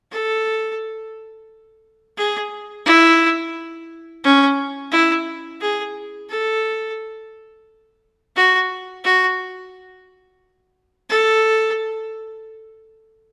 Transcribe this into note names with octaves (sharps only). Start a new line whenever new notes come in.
A4
G#4
E4
C#4
E4
G#4
A4
F#4
F#4
A4